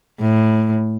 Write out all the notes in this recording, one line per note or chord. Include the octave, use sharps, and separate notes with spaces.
A2